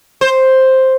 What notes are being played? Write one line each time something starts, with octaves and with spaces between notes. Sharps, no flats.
C5